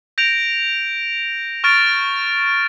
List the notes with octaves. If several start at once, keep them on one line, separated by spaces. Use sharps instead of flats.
G6 A#6 D7 F7
C#6 F6 A6 D7